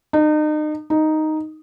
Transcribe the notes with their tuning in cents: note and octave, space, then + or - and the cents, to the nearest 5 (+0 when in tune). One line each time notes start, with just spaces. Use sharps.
D#4 -35
D#4 +0